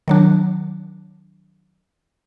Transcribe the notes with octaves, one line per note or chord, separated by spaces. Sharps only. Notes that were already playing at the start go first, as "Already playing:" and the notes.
D#3 F#3 D4